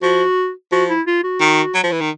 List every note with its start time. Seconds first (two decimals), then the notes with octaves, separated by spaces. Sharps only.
0.02 F3 F#4
0.72 F3 F#4
0.90 E4
1.07 F4
1.24 F#4
1.41 D#3
1.74 F#3
1.83 F3
1.92 E3
2.01 D#3